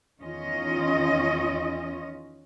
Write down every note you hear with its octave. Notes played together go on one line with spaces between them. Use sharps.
E2 D#3 C#4 F4 D#5